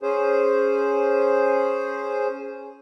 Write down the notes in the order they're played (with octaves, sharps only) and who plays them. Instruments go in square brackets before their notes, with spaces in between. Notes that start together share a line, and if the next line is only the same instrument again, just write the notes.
[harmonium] C#4 G#4 C5